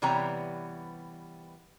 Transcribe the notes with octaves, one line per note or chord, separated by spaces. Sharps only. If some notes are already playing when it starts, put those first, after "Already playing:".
C3 E3 G3 B3 C#5 A#5